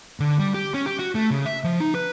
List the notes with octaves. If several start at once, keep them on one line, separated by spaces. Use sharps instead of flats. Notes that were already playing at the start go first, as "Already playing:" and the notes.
D3
G3
G4
C#4
G4
F#4
A3
C#3
E5
F3
D#4
B4